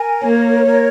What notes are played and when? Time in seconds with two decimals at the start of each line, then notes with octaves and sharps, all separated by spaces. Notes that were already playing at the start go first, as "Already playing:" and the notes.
Already playing: A#4 G#5
0.22 A#3 C#5
0.67 A#4